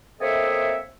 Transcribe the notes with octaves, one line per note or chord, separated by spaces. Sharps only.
A#3 C4 A4 C#5 D#5 E5